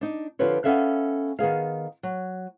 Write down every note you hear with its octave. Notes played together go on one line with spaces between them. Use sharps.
D4 D#4
D3 F3 F4 G4 B4 C#5
B3 C#4 A4 E5 F5
D#3 B3 G#4 F5
F#3